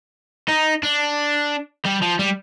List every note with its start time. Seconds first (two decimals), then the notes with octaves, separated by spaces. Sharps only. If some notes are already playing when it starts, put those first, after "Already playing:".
0.48 D#4
0.83 D4
1.86 G3
2.02 F3
2.19 G3